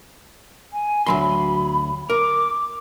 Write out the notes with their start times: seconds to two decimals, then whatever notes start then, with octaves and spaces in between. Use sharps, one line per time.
0.73 G#5
1.06 D2 F#3 B5 C6
2.10 A#4 D6